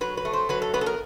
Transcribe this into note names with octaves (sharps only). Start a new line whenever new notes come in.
F#3 B4
B4
A3
C5
F#3 B4
A4
B3 B4
A4
A#4